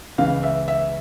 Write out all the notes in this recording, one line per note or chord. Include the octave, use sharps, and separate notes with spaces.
C#2 C#3 E3 F5
E5
E5